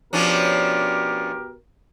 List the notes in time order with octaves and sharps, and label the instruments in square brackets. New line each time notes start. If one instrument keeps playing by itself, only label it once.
[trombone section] B2 G4 A#4 [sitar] F3 C#4 D4